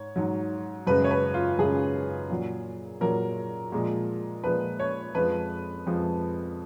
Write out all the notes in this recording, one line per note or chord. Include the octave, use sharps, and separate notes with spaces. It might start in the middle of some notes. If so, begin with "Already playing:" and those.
Already playing: G#2 C#5
G#2 F#3
F#2 C#3 G#3 B4
C#5
B4
F4
F#2 C#3 G#3 G#4
A#2 F#3
A#2 F#3 A#4
A#2 F3 G#3
A#2 F3 G#3 B4
C#5
F2 F3 G#3 B4
F2 F3 G#3